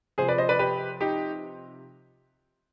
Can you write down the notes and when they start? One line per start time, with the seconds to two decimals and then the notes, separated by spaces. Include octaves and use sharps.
0.18 C3 F3 G#4 C5
0.28 B4 D5
0.38 C5 D#5
0.49 B4 D5
0.59 G4 B4
1.01 D#4 G4